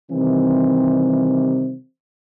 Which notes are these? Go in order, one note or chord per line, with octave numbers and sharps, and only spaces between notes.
C3 D#3 E3 G3 C4